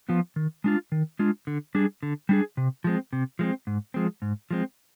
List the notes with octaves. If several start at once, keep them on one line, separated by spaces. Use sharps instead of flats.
F3 B3 F4
D#3
G#3 D4 F4
D#3
G#3 D4 F4
D3
G3 D4 G#4
D3
G3 D4 G#4
C3
F3 G#3 C4
C3
F3 G#3 C4
G#2
F3 G#3 C4
G#2
F3 G#3 C4